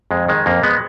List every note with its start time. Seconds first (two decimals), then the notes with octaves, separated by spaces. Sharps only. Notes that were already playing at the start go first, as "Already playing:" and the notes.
0.11 F2 G#3
0.28 D#3 G#3
0.46 F2 A#3
0.63 G#3 B3